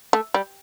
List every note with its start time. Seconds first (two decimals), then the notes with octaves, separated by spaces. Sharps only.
0.13 A3
0.34 G3